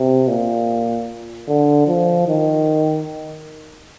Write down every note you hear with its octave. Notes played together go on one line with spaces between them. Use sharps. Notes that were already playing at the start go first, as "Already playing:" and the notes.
Already playing: C3
A#2
D3
F3
D#3